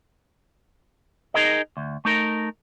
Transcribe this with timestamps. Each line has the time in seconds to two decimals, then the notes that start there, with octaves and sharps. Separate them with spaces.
1.34 D#4 G#4 A#4 D#5
1.77 D2
2.05 A3 D#4 A#4